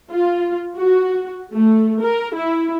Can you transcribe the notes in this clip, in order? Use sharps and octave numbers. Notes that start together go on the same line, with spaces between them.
F4
F#4
A3
A#4
E4